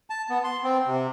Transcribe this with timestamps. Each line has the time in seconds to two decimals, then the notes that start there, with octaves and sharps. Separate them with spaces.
0.10 A5
0.30 B3
0.44 C6
0.63 C4
0.87 C3